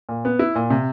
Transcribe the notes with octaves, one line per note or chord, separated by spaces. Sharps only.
A#2
B3
E4
A#2
C3